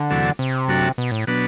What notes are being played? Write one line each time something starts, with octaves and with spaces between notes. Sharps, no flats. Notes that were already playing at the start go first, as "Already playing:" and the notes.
Already playing: D3
E2 C3 F#3 A3 D4
C3
F#2 F#3 A3 D4 F#4
B2
A2
B2 F#3 B3 D4